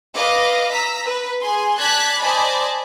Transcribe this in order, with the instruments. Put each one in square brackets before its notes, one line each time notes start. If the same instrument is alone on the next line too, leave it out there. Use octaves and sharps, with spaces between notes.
[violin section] B4 D#5 F5 D6
A#5 E6 B6
B4
G#4 G#5 C6
D5 A5 F#6 G#6 B6
C5 D5 D#5 G#5 A5 B5